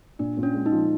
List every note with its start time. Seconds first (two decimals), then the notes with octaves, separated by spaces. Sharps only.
0.19 A#2 D4
0.37 A#2
0.43 C#4
0.54 G#3
0.66 D#4
0.72 F3